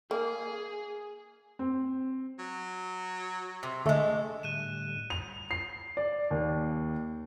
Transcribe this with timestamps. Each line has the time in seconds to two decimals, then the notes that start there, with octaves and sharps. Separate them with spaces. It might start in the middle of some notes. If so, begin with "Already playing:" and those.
0.11 A#3 G#4
1.59 C4
2.39 F#3
3.63 C3
3.86 D3 G#3 A3 A4
4.43 A2 D3 G3 F#6 D#7 E7
5.10 F7
5.51 C7
5.97 D5
6.31 D#2